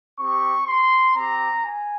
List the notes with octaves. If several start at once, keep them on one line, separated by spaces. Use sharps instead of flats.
C4 G4 C#6
C6
C4 G4 A#5
G#5